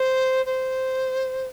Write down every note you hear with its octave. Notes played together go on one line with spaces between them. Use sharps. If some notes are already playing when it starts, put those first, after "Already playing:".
Already playing: C5
C5